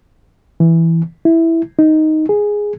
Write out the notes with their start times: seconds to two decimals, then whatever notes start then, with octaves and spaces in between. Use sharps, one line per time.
0.60 E3
1.25 E4
1.79 D#4
2.29 G#4